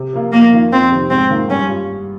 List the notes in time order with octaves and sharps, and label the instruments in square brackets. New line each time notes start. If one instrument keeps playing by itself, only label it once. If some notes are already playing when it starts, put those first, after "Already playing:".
Already playing: [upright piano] C3
F3 A#3 F4
[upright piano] F2 [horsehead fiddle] A#3
[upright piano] D#3 A#3 F4
[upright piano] F2 [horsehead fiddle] C4
[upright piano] C3 D#3
[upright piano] G#2 [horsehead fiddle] C4
[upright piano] D#3 A#3 F4
[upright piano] G2 [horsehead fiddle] C#4
[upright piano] G3 F4